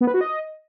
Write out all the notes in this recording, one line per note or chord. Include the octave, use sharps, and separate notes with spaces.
B3
B4
F#4
D#5